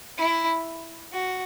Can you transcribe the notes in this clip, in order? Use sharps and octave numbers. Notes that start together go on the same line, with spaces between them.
E4
F#4